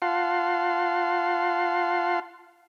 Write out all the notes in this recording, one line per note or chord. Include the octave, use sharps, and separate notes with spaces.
F4 F5 F#5 A5 C6